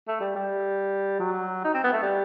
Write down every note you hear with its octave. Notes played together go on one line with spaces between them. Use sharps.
A3
G3
G3
F#3
D#4
C4
B3
A3
G3